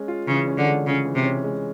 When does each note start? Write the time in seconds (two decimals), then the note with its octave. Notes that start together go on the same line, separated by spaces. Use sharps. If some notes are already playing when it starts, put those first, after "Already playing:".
Already playing: G#3 C#4
0.08 F4
0.28 C#3 E3
0.47 C#4
0.58 D3
0.67 G#3
0.86 C#3 F4
1.05 E3
1.15 C3
1.25 C#4
1.44 G#3